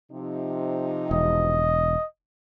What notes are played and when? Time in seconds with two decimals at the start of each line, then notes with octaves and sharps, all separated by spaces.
0.11 C3 F3 D#4
1.11 E1 D#5